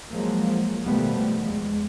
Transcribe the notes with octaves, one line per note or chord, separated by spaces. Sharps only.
F3 F#3 G#3 A#3
B2 D#3 F3 G3 A3 B3
E2 G#3